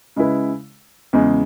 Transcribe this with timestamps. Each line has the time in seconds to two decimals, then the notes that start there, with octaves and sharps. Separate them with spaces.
0.16 C#3 G#3 E4 B4
1.13 E2 C#3 G#3